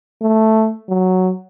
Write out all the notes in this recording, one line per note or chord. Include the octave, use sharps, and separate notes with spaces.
A3
F#3